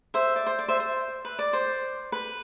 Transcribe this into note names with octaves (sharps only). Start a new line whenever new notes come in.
C5 E5
D5
C5
D5
C5 E5
C5
B4
D5
C5
B4